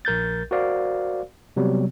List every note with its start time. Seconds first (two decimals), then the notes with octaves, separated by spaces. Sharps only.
0.05 A#1 A#4 G6 A6
0.51 F#4 A#4 C5 D5 F5
1.56 C3 F#3 G3 B3